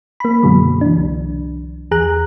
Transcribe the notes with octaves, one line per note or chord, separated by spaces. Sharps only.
A#3 B5
F#2 B2 D3 F#3 G#3
E3 D4
C2
E2 G#4 A#5 F#6